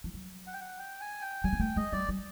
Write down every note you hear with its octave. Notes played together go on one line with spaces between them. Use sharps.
F3
F#3
F#5
G5
F#5
G5
G#5
G5
G3 G#5
A#3
A3 G5
G#3 D#5
G3 D5
G3